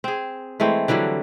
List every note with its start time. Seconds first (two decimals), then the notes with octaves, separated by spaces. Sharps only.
0.04 C4 G#4
0.60 E3 G#3 A3 C4
0.88 D3 E3 F#3 G3